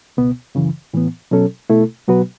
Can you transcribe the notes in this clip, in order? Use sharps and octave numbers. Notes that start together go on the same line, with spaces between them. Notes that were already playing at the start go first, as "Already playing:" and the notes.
C#2 B2 B3
F#2 C#3 E3
A2 E3 B3
B2 F#3 C#4 A4
B2 A3 E4 A4
B2 F#3 B3 F#4 B4